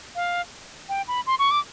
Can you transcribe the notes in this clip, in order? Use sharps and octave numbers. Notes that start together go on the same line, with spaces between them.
F5
G5
B5
C6
C#6
D6